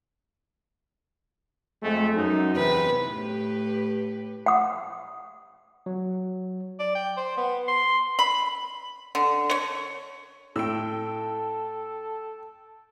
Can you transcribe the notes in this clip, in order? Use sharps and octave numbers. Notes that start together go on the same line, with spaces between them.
F2 G#3 A3
F#2 D#4
E2 C3 B4
A2 G4 B4
F#5 D#6
F#3
D5
G5
C5
B3
C6
B5
D3
C#5
A2 A4 G5 E6